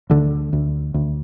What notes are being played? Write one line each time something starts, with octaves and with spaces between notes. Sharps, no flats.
D2 D3
D2
D2